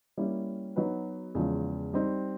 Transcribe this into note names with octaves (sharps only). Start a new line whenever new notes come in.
G3 A#3 C#4 E4 G4
F#3 B3 D#4 F#4 B4
E2 C#3 F3 G#3
G3 C4 D#4